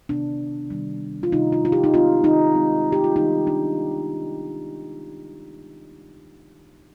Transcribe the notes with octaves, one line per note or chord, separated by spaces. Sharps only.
C3 D#3 B3 D4
C3 D#3 G3
F4
C3 D#3 G3 D#4
F4
F4
G4
D#4
D#3 G#3 C4 F4
D#4
D#3 G#3 C4
G4
F4
D#3 G3 B3 D#4
D4